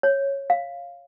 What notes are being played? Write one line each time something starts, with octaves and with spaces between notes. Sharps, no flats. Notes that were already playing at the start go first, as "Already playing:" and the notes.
C#5
F5